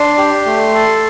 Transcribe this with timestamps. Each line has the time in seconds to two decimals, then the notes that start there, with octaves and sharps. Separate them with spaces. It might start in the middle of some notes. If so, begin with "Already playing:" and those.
Already playing: D4 C6
0.18 G4
0.46 A3
0.74 A4